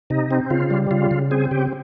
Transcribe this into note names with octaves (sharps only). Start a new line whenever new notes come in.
C3 D#4
C4
C#3 F4
G3
C#3 F4
C#3
C4 G#4
C#3 G4